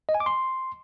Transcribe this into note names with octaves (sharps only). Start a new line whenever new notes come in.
D#5
G#5
D6
C6